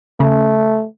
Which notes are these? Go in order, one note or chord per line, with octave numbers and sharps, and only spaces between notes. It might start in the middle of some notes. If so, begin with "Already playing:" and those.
C#3 A3